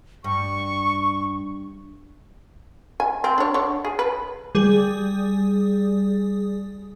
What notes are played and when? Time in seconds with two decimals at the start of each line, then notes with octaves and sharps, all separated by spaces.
0.24 G2 C#6
3.00 G#5
3.24 C4
3.38 D4 C#5
3.54 D3 C#5
3.85 G#4
3.99 B4
4.55 G3 G#4